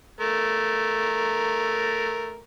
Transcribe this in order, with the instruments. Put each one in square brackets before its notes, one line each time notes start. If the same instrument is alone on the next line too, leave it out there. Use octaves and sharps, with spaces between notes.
[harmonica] A3 A#4